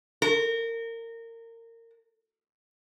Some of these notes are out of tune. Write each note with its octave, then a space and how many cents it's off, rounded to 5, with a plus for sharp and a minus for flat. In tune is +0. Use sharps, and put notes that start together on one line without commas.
A#4 -25